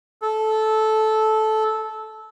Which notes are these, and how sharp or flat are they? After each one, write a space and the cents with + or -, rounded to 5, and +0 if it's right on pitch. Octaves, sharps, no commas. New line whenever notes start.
A4 -15